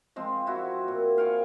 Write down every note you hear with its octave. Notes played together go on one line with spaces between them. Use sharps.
F3 G#3 C4
E4 F#4
A#2
F5 G5 G#5 C#6